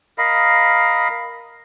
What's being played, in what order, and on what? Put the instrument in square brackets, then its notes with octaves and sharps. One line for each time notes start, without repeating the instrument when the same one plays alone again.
[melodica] A#4 D#5 F5 B5